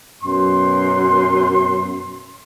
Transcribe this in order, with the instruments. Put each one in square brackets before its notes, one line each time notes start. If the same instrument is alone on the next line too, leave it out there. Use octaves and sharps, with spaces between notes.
[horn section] F#2 B2 C6